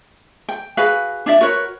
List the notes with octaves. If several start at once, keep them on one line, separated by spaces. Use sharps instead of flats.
G5
F#4 G#4 B4 F5
D4 E4 D5 E5
F#4 A#4 B4 C#5